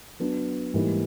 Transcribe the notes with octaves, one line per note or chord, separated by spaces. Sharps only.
F#3 B3 D4
G#2 E3 G3 A#3 D#4